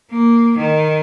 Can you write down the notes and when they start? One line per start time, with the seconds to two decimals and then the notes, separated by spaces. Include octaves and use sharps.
0.11 A#3
0.58 D#3